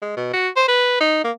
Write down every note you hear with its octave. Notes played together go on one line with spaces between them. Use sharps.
G#3
B2
F#4
C5
B4
D#4
A#3